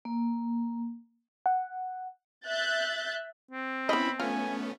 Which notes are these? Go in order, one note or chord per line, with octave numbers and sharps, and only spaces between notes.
A#3
F#5
E5 F#6 G6 A6
C4
B3 C#4 E4 D#5 B5
A3 B3 C#4 F4 G#5